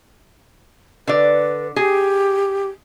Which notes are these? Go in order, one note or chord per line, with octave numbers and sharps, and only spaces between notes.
D3 B4 D5
G4 G#4